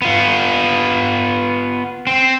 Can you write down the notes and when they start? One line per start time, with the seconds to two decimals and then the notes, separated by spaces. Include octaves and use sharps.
0.02 B3 F4
2.07 C4